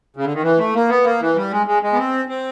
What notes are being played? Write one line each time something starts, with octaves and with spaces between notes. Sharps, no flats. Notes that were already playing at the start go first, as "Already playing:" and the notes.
C#3
D3
D#3
E3
A3
A#3
B3
A#3
E3
G3
G#3
G#3
G#3
B3
C4
C4